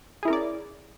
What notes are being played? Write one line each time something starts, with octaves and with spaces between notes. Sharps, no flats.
C#4 E4 G#4 A#4 D5